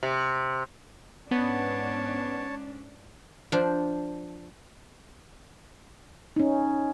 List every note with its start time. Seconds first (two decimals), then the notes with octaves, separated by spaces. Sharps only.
0.03 C3
1.31 G#2 B3 C#4 D4 C#5 A5
3.52 F3 D4 C5
6.36 C#4 D#4